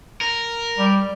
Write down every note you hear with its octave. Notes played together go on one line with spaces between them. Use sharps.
A#4
G3